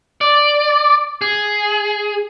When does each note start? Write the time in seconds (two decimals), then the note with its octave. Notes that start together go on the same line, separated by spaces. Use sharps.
0.21 D5
1.21 G#4